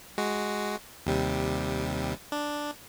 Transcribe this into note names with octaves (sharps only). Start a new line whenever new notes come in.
G#3 F#4
D#2 C3 G3
D4